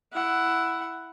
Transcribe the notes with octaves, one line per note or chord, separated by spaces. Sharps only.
E4 F#5